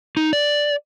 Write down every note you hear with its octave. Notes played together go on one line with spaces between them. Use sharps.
D#4
D5